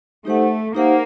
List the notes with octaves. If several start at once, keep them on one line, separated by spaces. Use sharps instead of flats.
A3 D#4 G4 C5 F#5
A#3 D#4 G4 C5 F#5